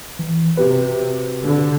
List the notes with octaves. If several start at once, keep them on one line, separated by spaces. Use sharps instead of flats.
E3
C3 F#4 G4 B4
D3